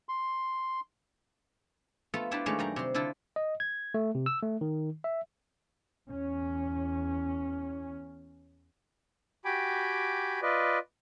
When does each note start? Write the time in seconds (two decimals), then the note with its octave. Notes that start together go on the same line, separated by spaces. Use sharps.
0.09 C6
2.14 A3 B3 F4 A4
2.31 D4 E4 F4 G4 A4 B4
2.46 D#3 G#3 A3 C#4 D5 F5
2.59 F#2 G3 A#5
2.76 C3 C6
2.94 D3 E4 F4 A4
3.36 D#5
3.60 G#6
3.94 A3
4.15 C3
4.26 E6
4.43 A3
4.61 D#3
5.04 E5
6.10 E2 C#4
9.45 F#4 G4 G5 G#5 B5 D6
10.42 F4 B4 D5 D#5